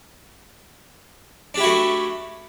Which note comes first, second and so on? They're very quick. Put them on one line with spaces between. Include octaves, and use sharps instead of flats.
D4 G4 E4 F#4 A3